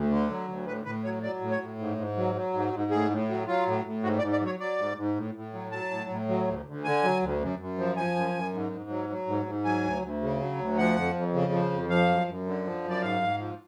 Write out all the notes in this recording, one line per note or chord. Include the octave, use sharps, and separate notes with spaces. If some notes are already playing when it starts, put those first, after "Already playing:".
Already playing: D2
D3
F#3
D2
A2 B4
A2 B4
F#3 C#5
F#3 D5
A2
C#5
A2
G#2
G#2
F#3
F#3
G#2
G#2
A2 G#4
A2
F#3
F#3 F4
A2
A2
G#2 F#4
D5
G#2
D5
F#3 C#5
F#3 D5
G#2
G#2
A2
A2
F#3
F#3 A5
A2
A2
F#3
D2
D2
D3 G#5
F#3
D2
F#2
F#2
F3
F3 G#5
F#2
F#2
G#2
G#2
F#3
F#3
G#2
G#2
F#3 G#5
D2
D2
C#3
F#3
D2
F3 F#5
F2
F2
C#3
F3
F2
F3 F5
F#2
F#2
D3
F3
F#2
D5
G#2 F5
G#2
F3